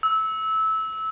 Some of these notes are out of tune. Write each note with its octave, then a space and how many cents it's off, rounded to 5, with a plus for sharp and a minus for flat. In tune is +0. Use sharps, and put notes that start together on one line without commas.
E6 -20